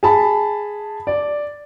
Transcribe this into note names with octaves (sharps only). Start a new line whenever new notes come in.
G#4 A5 B5
D5